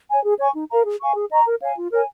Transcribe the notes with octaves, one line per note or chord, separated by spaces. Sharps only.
C#5 G#5
G#4
C#5 G#5 C#6
D#4
A#4 F5 A#5
G#4
F5 G#5 C#6
G#4
D#5 A#5 C#6
A#4
C#5 F5 G#5
F4
A#4 C#5 G#5